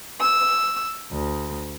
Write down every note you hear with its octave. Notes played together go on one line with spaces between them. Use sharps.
E6
D2